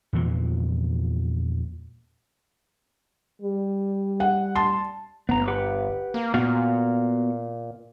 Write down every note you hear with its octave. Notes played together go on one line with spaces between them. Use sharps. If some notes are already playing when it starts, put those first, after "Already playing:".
E2 A#2 E3 F3
G3
F#5
A5 C6
G1 B3 A#5
G4 B4 F#5
A#3
A#2 B3 F#4 F5